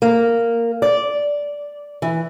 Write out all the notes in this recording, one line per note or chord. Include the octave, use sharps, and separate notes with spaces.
A#3
D5
E3